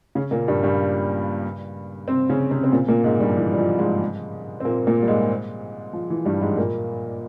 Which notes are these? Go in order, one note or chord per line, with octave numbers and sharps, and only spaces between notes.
C#3 C#4
A#2 A#3
G2 G3
G2 G3
C3 C4
C#3 C#4
C3 C4
C4
A#2 A#3
A#2 A#3
G#2 G#3
G2 G3
F3
E3
G3
F3
G#2 G#3
C4
A#2 A#3
A#2 A#3
G3
G#2 G#3
F3
E3
G2 G3
G#2 G#3
A#2 A#3